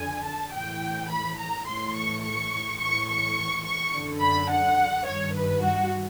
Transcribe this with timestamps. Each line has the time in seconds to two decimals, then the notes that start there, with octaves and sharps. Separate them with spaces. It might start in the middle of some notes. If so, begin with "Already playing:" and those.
Already playing: F2 D3 G#5
0.24 A5
0.53 A2 E3 G5
1.09 B5
1.38 A#5
1.66 A2 E3 C6
1.95 C#6
2.22 C#6
2.79 A2 E3 C#6
3.08 C#6
3.65 C#6
3.93 F#2 D3
4.21 B5
4.50 F#5
5.06 G2 D#3 C#5
5.34 B4
5.63 F#4